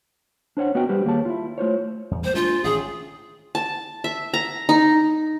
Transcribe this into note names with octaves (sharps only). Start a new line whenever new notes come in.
D4 C5 C#5 F#5
B3 F#4 B4 D#5 G5
G3 G4 B4 C5
D#2 A#3 G#4 C#5 A5
E4 F4
A3 F4 C5 C#5
E2
G3 A#3 C5
G#3 A#3 D4 F4
A1 D#3 C#4 G#4
A5
E5
A#5
D#4